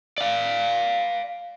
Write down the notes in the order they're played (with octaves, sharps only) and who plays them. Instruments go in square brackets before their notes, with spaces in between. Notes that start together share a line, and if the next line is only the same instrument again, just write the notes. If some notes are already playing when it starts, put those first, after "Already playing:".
[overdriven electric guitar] D5 F5